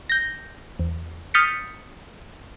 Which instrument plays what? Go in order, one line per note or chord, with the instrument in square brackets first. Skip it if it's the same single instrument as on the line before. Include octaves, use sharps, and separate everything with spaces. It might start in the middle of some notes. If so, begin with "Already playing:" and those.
[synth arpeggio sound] G6 A#6
E2
D#6 F6 G6 A6 B6 C#7